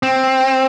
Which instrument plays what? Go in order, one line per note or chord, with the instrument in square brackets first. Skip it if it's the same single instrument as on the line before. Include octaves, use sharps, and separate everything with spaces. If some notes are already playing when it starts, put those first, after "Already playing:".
[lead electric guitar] C4